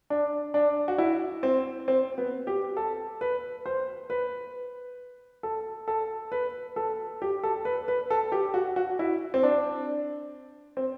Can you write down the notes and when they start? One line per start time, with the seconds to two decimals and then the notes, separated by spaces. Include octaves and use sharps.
0.10 D4
0.54 D4
0.88 F#4
0.98 E4
1.43 C4
1.88 C4
2.18 B3
2.47 G4
2.77 A4
3.21 B4
3.66 C5
4.10 B4
5.43 A4
5.88 A4
6.32 B4
6.76 A4
7.22 G4
7.43 A4
7.65 B4
7.88 B4
8.10 A4
8.32 G4
8.54 F#4
8.76 F#4
8.99 E4
9.34 C4
9.43 D4
10.77 C4